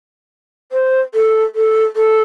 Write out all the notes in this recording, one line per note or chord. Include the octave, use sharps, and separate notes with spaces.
C5
A4
A4
A4